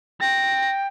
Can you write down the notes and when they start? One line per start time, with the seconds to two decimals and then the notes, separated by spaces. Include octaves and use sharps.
0.21 G5 A#6